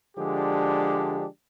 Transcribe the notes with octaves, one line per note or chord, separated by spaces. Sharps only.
D3 F3 G#3 D4 G4